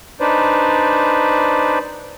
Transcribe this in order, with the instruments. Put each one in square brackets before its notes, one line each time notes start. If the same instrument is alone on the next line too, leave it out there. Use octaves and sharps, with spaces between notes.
[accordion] D4 D#4 B4 C5 D5